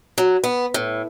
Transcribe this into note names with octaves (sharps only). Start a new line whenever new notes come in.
F#3
B3
A2